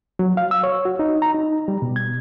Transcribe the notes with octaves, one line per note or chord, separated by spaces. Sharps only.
F#3
F5
E6
C#5
F#4
D#4
A#5
D#4
G3
B2
G#6